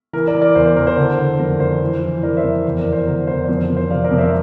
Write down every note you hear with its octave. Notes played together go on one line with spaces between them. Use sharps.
E3 A#4
A#4 D5
E3
A#4 D5
E2 C5
C5
E2 A#4
C5
D3
D3
F2 A#4
F2 C5
E3
E3
E3 A#4 D5
C5 E5
F2
E2
A#4 D5
E2
C5
D3 A#4
E2 C5
D5
F2 C5
A#4
F2
C5
C3 D5 F5
A#4 D5
F2
C5 E5